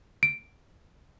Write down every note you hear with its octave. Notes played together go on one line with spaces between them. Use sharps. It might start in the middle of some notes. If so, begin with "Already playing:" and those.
D7